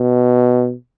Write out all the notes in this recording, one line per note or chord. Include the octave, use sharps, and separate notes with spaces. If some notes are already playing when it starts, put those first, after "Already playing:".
Already playing: B2